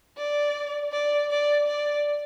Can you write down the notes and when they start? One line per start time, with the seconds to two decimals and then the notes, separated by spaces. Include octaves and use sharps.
0.17 D5
0.92 D5
1.30 D5
1.67 D5